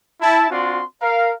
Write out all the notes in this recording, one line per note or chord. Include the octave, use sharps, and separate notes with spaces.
E4 A5
C4 D4 F4 F#4 D5 C6
A#4 F5